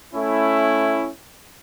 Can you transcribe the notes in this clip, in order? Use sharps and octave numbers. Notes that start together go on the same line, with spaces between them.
A3 C#4 E4